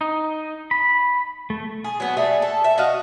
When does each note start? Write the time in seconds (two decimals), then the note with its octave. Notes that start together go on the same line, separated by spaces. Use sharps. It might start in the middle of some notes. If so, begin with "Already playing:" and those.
0.01 D#4
0.71 B5
1.50 A3
1.84 G#4
2.00 F#3 B3
2.17 G3 A3 G#4
2.42 A4
2.64 E5
2.78 F#4 D#5 F5